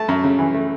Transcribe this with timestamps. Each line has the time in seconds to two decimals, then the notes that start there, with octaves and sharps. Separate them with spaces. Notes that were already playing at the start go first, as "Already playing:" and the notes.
Already playing: A3 A5
0.08 F#2
0.24 C#3
0.39 E3
0.54 A3